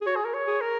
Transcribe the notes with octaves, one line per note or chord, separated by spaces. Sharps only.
G#4
F#4 C#5
G#4
A#4
C#5
G#4
A#4